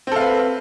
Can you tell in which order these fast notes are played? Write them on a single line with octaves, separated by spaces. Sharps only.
C4 A4 F5 B4